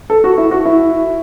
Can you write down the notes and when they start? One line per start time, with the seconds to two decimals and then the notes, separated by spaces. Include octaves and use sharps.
0.10 A4
0.24 F#4
0.38 E4
0.51 F#4
0.66 E4